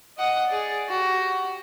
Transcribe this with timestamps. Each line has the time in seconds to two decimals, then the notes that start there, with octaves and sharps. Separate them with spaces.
0.18 D#5 F#5 D#6
0.47 G#4 D5
0.88 F#4 G4